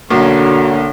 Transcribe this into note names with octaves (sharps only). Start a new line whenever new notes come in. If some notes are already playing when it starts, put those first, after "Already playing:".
B1 D3 A#3 C#4 F#4